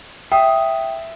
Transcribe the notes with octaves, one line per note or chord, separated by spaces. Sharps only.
E5 G5 D#6